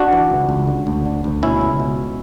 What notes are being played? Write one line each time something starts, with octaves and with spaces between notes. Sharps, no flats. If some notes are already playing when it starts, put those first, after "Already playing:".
Already playing: D4 F#4
E3
C#2
C#2
D3
D2
D3
D2
B2 C#4 E4
C#2
B2